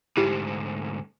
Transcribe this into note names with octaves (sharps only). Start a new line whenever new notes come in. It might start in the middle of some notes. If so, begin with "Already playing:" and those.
D2 G#2 E4 G4